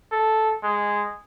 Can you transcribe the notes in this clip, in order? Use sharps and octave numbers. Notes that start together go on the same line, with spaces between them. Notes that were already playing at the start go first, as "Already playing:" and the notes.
A4
G#3